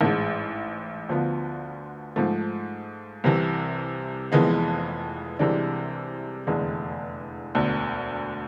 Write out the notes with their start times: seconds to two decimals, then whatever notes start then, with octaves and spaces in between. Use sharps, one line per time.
0.01 A1 G#2 G#3
1.09 D2 D3 F3 B3 F4
2.16 G#2 F3 A3
3.24 C2 C3 E3
4.32 F1 F2 E3 G#3 B3
5.39 C2 C3 E3 G#3 D4
6.47 F1 E2 D3 G#3
7.55 E1 D2 D3